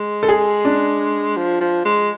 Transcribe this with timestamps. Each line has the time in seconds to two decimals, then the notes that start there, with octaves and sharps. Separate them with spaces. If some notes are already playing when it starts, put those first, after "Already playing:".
Already playing: G#3
0.23 A4
0.29 G#4
0.65 D4
1.37 F3
1.61 F3
1.85 G#3